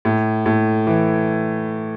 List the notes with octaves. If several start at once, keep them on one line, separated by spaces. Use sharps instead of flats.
A2
A2
E3